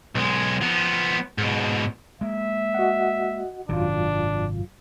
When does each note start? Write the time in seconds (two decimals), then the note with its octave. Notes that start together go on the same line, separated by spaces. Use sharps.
0.15 B1 G#3
0.62 F3 B3
1.38 G#2 B2
2.21 G#3 A#3 E5
2.74 F#4 D#5 F#5
3.69 G#1 F#2 C3 D#3 F#3 D4 F4